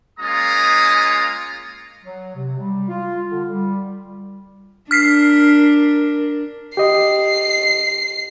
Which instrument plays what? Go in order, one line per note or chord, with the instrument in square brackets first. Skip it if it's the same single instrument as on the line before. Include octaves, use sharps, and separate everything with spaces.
[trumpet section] G#3 A#3 C#4 F4 A#5 D#6
[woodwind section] F#3
C3
G3
F4
D3
G3
[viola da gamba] D4 A#4 [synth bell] F6 B6 C7
[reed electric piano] G4 D#5 [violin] C7